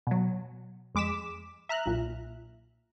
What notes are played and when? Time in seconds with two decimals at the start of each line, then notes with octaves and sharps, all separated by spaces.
0.07 B2 F#3
0.95 F2 G#3 D6 B6 E7
1.69 E5 A#5 F6 F#6
1.86 B1 A#2